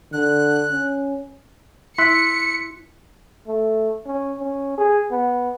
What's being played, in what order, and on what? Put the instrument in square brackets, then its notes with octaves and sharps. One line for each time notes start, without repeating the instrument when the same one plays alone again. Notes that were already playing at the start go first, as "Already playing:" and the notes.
[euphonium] D3 [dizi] F#6
[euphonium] C#4
[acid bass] E4 [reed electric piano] C6 E6 F#6 [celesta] B6 [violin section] C#7
[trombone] A3
C#4
C#4
G#4
B3